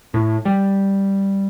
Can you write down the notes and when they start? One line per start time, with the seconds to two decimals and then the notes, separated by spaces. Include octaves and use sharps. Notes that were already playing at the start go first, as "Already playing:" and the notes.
0.14 A2
0.45 G3